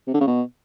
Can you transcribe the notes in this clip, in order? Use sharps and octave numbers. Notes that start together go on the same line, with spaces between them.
C3
D3
C#3
B2